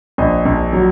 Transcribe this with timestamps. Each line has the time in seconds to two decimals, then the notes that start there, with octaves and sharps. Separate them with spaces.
0.18 A#1 D#5
0.45 A#1
0.73 F#3